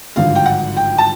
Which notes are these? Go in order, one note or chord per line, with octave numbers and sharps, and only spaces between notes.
G#1 G2 D3 F3 F5
G5
F#5
G5
A5